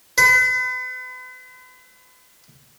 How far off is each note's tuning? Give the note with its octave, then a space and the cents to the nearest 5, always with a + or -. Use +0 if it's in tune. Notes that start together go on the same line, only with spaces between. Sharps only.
B4 +40